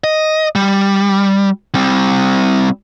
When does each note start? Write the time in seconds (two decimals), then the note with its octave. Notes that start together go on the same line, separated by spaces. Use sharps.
0.04 D#5
0.56 G3
1.75 G3 C4